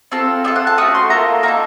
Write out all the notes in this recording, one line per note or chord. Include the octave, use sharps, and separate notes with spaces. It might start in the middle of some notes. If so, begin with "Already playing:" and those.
C4 F4 A4
C4 F4 A4 D#5
F#5
A5
A3 C#4 F#4 D#6
C6
A#3 F4 A4 A#5
A#3 D#4 A4 A#5